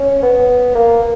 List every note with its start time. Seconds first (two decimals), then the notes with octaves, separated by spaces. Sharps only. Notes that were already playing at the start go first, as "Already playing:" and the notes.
Already playing: C#4
0.22 B3
0.75 A#3